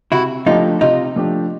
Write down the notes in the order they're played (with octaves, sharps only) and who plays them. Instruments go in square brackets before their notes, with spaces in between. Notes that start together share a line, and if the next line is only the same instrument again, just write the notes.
[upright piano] C3 [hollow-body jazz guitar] E4 F#4
[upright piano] F3 A3 D4 G4 [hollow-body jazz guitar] D#4 F4
[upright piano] C3 [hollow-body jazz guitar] D#4 F4
[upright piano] F3 A3 D4 G4